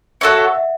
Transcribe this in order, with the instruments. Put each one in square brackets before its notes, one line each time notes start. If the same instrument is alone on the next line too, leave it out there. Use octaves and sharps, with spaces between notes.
[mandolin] F#4 A4 C#5 [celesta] E5
[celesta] F#5
E5